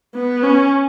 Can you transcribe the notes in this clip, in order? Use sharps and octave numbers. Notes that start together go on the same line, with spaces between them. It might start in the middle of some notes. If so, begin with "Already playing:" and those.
B3
C#4